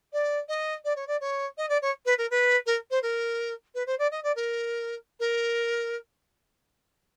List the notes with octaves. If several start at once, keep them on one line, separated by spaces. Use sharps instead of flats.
D5
D#5
D5
C#5
D5
C#5
D#5
D5
C#5
B4
A#4
B4
A#4
C5
A#4
B4
C5
D5
D#5
D5
A#4
A#4